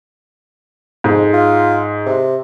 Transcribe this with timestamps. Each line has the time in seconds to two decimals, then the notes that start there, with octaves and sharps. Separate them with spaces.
1.04 F2 G#2
1.33 F4
2.06 C3